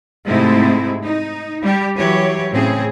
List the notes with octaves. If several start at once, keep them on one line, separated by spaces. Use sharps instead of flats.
G#2 C3 A3 C4 D#4 E4
D#4
G3 G4
E3 F#3 G4 C#5
A2 C#3 C4 G#4